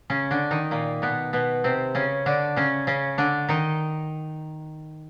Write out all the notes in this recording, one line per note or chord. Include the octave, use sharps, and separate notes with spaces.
C#3 C#4
D3 D4
D#3 D#4
A#2 A#3
B2 B3
B2 B3
C3 C4
C#3 C#4
D3 D4
C#3 C#4
C#3 C#4
D3 D4
D#3 D#4